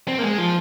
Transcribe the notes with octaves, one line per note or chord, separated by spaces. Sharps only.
C4
A#3
G#3
F3